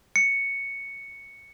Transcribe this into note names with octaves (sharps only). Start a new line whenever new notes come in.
C#7